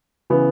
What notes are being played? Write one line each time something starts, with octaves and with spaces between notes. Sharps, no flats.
C#3 E3 B3